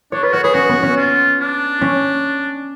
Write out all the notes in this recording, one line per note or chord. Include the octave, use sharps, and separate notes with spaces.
D4 C#5
F4 B4
F#4 C#5
G#4 B4
C#4 F#4
B3
C#4
F4
D4
C#4